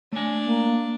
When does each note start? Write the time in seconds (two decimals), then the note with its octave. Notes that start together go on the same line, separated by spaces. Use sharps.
0.12 A3 D4 G#5
0.45 A#3